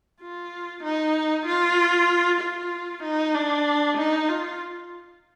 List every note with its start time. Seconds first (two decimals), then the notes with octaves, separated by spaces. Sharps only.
0.21 F4
0.84 D#4
1.46 F4
2.41 F4
3.03 D#4
3.35 D4
3.97 D#4
4.28 F4